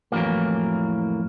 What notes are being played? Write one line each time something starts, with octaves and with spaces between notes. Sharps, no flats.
F2 A2 C3 E3 F#3 A#3